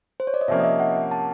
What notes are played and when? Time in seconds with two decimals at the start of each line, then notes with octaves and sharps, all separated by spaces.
0.20 C5
0.27 C#5
0.34 D5
0.41 D#5
0.48 C3 F3 A#3 C#4 E5
0.60 D#5
0.64 E5
0.80 F#5
0.96 F#5
1.11 A5